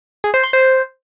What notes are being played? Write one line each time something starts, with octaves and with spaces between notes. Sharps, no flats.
G#4
C5
C6
C5